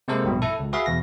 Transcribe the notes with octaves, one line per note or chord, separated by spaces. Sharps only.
C3 G#3 A#3 A4 A#4 C5
A#1 G2 B2
E4 A4
C#2
F#4 G#4 B4 E5 F5
E2 B2 A#6